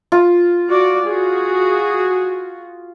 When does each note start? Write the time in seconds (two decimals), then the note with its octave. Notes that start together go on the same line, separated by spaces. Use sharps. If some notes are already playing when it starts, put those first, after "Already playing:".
0.12 F4
0.69 F#4 D5
1.06 F#4 G#4